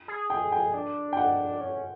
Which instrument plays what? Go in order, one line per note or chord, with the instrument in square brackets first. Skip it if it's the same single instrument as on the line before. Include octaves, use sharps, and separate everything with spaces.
[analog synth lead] G#4
[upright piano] G5
G5
[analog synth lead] D4
[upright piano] G5
F#5
[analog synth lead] C#4